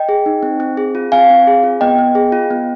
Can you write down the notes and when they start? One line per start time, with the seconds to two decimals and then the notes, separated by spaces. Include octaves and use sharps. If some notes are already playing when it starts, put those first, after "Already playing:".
Already playing: D#5 G5
0.09 G#4
0.26 D#4
0.43 C4
0.60 C4
0.77 G#4
0.95 F4
1.12 C4 F5 G#5
1.30 C4
1.47 G#4
1.63 F4
1.81 B3 D#5 G5
1.98 B3
2.15 G#4
2.32 F4
2.50 B3